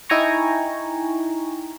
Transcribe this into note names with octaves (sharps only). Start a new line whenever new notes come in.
D#4 E4 G5 G#5 A#5 C#6